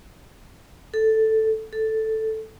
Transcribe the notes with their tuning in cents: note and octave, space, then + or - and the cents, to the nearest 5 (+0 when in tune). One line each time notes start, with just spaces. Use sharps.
A4 +0
A4 +0